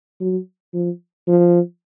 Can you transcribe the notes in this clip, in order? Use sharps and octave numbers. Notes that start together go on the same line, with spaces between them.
F#3
F3
F3